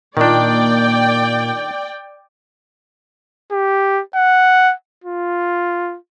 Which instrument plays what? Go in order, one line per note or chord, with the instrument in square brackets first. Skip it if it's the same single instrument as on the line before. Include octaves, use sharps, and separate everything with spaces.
[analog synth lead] A#2 [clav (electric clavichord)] D#3 D4 [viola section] D5 G5
[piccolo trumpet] G4
F#5
F4